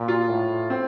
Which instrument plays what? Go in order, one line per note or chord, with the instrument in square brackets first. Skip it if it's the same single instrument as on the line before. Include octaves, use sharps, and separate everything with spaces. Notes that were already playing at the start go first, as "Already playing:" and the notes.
Already playing: [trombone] A#2
[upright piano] F4
[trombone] A2
[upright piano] C4